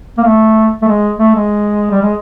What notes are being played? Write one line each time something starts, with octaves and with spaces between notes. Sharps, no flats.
A#3
A3
A3
G#3
A3
G#3
G3
G#3